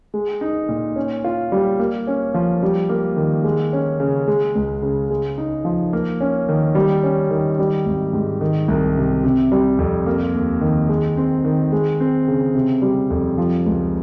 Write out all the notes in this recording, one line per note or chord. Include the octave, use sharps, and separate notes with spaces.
G#3
D#4
A#2
C#4
F4
G3
A#3
C#4
F3
G3
A#3
D#3
G#3
C#4
C#3
G#3
C#2
C#3
G#3
D#4
F3
A#3
C#4
D#3
G3
C#4
D#3
G3
G#1
G#2
D#3
C2
C3
C3
G3
F2
A#3
D#2
D#3
G#3
C4
D#3
G#3
C4
C#3
C3
G3
F2
F3
C#2